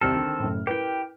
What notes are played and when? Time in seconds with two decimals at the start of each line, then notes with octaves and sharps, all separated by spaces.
0.01 C2 D#3 G3 C4 A4 F6
0.16 D3
0.39 F#1 A2
0.67 E4 G4 A#4 B4 G5